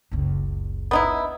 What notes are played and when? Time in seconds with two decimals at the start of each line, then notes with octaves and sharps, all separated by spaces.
0.11 F#1 C#2
0.91 B3 D#4 E4